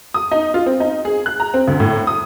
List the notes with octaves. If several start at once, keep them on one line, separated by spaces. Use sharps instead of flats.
D#6
D#4
F4
C4
D#4
G#4
F#6
A#5
C4
D2
A2
D#6